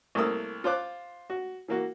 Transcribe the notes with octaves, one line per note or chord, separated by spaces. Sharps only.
C2 A3 A#3 D#6 E6
F4 C5 D6 F#6
F#4
E3 A#3 F#4